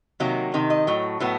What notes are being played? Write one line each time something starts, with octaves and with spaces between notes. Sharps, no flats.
C3 D#3 F#3 A#3
C3 D#3
D#5
A2 F#3
A2 F#3 B3